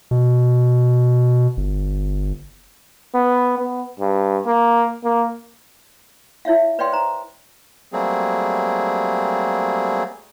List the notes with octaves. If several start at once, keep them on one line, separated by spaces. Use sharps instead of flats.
B2
G1
B3
B3
G2
A#3
A#3
E4 C#5 E5 F5
B4 C#5 D5 F5 G5 C6
C5 A#5
F#3 G3 A3 A#3 C4 G#4